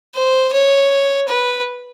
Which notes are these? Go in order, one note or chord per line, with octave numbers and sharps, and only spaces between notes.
C5
C#5
B4